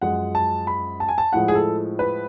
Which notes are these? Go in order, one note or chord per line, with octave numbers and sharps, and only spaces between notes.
F#2 F3 G#3 F#5
A5
B5
A5
G#5
A5
A2 F3 G#3 F#5
G#4
A4
B4